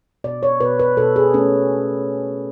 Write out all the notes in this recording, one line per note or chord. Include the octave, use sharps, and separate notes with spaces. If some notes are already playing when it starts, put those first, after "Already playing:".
B2 D5
C#5
B2 B4
B4
B2 A4
G#4
A3 C#4